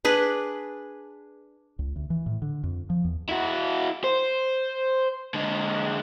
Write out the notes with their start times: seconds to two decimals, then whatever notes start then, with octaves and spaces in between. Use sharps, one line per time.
0.05 D4 G#4 B4
1.79 C#2
1.96 D2
2.10 E3
2.26 A2
2.42 D3
2.63 F2
2.90 F3
3.04 E2
3.29 E4 F#4
4.04 C5
5.34 D3 G#3